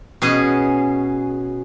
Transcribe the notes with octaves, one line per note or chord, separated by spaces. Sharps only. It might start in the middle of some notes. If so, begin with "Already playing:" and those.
B2 C#4 G#4